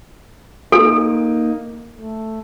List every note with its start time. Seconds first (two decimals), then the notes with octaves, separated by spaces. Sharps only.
0.72 A#3 D#4 A4
1.98 A3